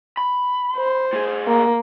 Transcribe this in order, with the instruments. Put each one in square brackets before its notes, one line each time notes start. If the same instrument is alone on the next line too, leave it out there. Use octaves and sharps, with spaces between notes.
[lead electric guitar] B5
[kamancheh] C5
[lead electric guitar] A2 G#4
[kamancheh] A#3